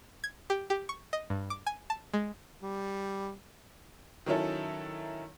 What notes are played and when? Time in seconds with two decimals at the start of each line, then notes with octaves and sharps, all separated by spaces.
0.24 G#6
0.50 G4
0.70 G4
0.89 C#6
1.13 D#5
1.30 G2
1.50 D6
1.66 G#5
1.90 A5
2.14 G#3
2.62 G3
4.26 D#3 F#3 C#4 E4 A4